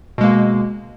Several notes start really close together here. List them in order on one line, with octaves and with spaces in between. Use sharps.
B2 G#3 A#3